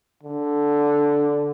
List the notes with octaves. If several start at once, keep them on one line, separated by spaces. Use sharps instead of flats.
D3